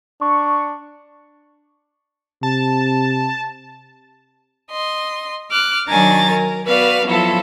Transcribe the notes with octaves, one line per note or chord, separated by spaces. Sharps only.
D4 C#6
C3 A5
D#5 C6
D6 F6 F#6
D#3 F#3 D4 G#5 A#5 A6
A#4
B3 F#4 B4 D5 F5
F3 F#3 B3 E4 A4